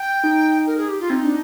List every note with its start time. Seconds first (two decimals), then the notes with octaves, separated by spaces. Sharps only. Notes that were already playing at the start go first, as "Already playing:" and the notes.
Already playing: G5
0.24 D#4
0.67 A#4
0.77 G#4
0.88 G4
1.00 F4
1.10 C4 D#4
1.24 D4